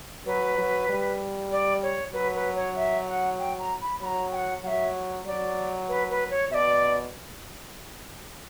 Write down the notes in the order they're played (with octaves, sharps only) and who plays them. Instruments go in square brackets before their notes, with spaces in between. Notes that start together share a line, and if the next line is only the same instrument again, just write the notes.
[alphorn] F#3 [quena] B4
[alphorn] F#3
G3
[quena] D5
C#5
[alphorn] F#3 [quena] B4
[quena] B4
C#5
E5
F#5
G5
A#5
B5
[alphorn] F#3 [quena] B5
[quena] A#5
G5
F#5
[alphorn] F#3 [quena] F#5
[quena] E5
[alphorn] F#3 [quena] D5
[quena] B4
B4
C#5
[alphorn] B2 [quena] E5
[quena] D5